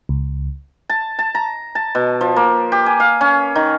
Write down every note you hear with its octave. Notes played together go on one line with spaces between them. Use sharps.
C#2
A5
A5
A#5
A5
B2
F3
A#3
G4
G#5
F5
C#4
D#3